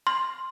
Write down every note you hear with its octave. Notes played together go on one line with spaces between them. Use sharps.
C6